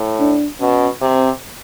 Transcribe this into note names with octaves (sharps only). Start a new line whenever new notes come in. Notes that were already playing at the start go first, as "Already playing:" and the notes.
Already playing: A2
D4
B2 C#4
C3 C4